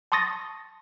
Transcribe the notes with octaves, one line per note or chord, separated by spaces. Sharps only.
A5 C6 C#6 D#6 A6 A#6